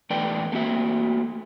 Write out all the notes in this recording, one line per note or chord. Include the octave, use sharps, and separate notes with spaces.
E2 A3 A4 B4 D5 G5
A3 A#3 C4 F#4 E5